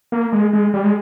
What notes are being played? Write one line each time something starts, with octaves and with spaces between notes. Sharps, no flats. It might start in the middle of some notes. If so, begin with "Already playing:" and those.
A#3
G#3
G#3
G3
G#3